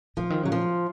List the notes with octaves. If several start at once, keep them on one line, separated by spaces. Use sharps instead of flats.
C#3 F3
D#3
C#3 F#3
F3